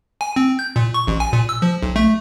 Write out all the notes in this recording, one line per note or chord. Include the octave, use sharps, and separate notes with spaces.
G#5
C4
G6
A#2
C#6
A1
G#5
A#2
E6
F3
B1
A3